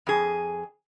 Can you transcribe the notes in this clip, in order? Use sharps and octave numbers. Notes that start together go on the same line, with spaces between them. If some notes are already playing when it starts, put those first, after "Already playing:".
F2 G#4